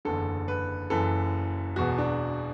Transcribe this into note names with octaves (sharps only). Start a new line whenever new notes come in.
F#1 E2 D3 A4
B4
F#1 F#2 E3 A4
E1 E2 B2 F#4
D4